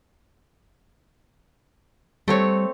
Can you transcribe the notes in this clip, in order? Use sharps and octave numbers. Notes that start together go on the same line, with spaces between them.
G3 A3 C4 C#5